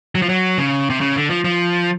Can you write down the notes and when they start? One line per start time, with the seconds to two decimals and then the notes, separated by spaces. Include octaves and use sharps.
0.15 F#3
0.22 F3
0.29 F#3
0.58 C#3
0.90 C3
1.01 C#3
1.16 D3
1.30 F3
1.44 F3